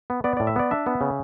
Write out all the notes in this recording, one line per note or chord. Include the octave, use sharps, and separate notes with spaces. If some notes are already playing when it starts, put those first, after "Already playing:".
B3
B3 D5
A2 D5
E5
B3 D5
D4 E5
B3
C#3